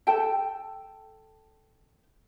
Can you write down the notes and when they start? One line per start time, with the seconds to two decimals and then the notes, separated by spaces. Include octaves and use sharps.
0.07 A4 G5 A5